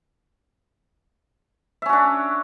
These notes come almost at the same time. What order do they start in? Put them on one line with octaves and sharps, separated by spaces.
E5 C#4 F#4 D4